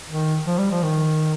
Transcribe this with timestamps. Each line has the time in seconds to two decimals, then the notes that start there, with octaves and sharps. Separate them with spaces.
0.10 D#3
0.47 F3
0.58 G3
0.71 F3
0.83 D#3